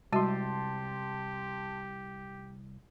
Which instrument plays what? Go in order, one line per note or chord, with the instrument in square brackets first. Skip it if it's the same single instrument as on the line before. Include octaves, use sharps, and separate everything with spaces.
[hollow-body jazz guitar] C2 [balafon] G3 G#3 F#4 [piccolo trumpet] G4 [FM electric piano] A5 C6